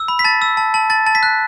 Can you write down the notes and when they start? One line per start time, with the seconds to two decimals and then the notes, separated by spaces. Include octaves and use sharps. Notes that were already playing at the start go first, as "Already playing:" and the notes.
Already playing: E6
0.08 B5
0.19 B6
0.24 A5 A6
0.42 E6
0.57 A5
0.74 A5
0.90 A5 A6
1.07 A5 A6
1.15 B6
1.23 F#6